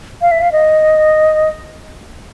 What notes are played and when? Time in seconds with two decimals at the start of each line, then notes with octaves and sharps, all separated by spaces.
0.22 F5
0.31 E5
0.42 F5
0.52 D#5